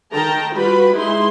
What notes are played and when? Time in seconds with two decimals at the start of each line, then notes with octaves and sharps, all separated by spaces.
0.12 D#3 G5 A5 A#5
0.54 G3 F4 F#4 B4 B5
0.96 G#3 D#4 E4 G#4 C6